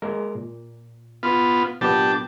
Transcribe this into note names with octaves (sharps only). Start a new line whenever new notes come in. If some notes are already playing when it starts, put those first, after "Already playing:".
G#3 A#3 A#4
A#2
B3 F4
A#2 F#3 B3 D4 G4 A5